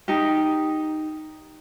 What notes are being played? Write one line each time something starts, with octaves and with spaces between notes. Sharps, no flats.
D#4 G4